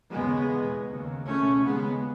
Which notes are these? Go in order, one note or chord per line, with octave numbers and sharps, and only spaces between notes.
D#2 C#3 G#3 B3
E2 B2
D#2 C#3
C#2 B2 A3 C#4
D#2 C#3 G#3 B3